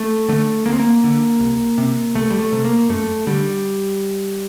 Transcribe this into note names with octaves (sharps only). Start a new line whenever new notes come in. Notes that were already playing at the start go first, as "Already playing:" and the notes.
Already playing: A3
D3 A3
D2 A#3
C4
A#3
D3
C2
C3
C2 A3
G3
A3
C3
A#3
F#2 A3
D3 G3